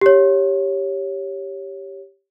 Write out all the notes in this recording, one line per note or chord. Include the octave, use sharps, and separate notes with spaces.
G4 C#5